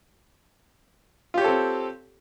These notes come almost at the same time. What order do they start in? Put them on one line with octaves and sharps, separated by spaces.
F4 G4 C#5 A4 C4